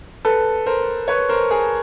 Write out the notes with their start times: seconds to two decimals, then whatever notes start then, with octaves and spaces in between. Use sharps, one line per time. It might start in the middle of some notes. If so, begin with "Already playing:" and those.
0.25 A4 B4
0.66 A#4 C5
1.08 B4 C#5
1.29 A#4 C5
1.50 G#4 A#4